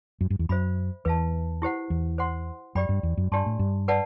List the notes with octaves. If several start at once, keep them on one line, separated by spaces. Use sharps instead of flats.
F#2
G2
E2
F#2 C5 E5 B5
E2 B4 E5 A5
E4 G4 C5 F#5
E2
C5 F#5 C6
F#2 G4 D5 G5 B5
G2
E2
F#2
G2 D4 G4 D5 A5 C6
A2
G2
B4 D5 F#5 A5